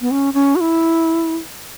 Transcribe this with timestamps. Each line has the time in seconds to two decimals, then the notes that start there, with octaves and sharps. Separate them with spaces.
0.01 B3
0.11 C#4
0.34 C#4
0.56 F#4
0.61 E4